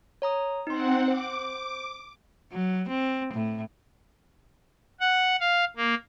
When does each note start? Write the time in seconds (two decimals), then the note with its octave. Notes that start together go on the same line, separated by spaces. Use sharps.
0.22 C#5 A#5 D#6
0.67 C4 D#4 F#5 C6
1.08 C5 D6
2.52 F#3
2.89 C4
3.34 A2
5.00 F#5
5.40 F5
5.76 A#3